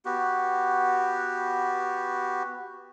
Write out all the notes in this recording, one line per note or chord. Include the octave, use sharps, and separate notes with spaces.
B3 F#4 G4